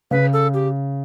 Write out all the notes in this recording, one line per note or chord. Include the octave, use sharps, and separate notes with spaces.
C#3 B4
A4
G4